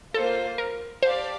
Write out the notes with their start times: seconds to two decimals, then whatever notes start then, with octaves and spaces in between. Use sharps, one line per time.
0.14 A#3 F4 A4 C5
0.58 A#4
1.03 G4 C5 D5 F5 A5